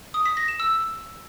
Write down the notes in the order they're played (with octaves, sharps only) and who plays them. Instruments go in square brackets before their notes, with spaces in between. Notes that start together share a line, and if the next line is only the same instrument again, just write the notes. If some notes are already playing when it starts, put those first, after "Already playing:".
[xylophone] D#6
B6
A#6
E7
E6